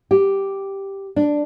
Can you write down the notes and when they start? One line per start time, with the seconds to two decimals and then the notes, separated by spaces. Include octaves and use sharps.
0.11 G4
1.16 D4